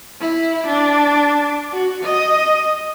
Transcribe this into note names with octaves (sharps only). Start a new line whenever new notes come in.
E4
D4
F#4
D#5